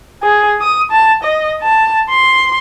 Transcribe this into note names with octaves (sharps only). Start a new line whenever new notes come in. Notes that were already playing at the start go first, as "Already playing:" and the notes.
G#4
D#6
A5
D#5
A5
C6